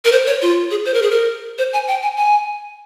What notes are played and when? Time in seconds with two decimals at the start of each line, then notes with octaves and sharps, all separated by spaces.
0.05 A#4
0.12 C5
0.26 C#5
0.42 F4
0.71 G#4
0.85 C5
0.94 A#4
1.02 G#4
1.11 A#4
1.58 C5
1.73 G#5
1.88 G5
2.03 G#5
2.17 G#5